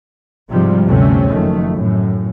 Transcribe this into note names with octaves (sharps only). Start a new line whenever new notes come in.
G#2 C3 F3 G3
G1 D2 C3 A3 C4 C#4
F#1 F2 D#3 A3
F#2 A2